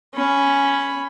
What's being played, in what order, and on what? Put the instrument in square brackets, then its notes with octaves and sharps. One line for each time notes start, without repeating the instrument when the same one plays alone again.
[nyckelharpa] C#4 B5